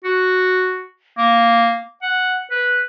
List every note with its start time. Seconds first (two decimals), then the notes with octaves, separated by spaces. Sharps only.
0.04 F#4
1.18 A#3
2.02 F#5
2.50 B4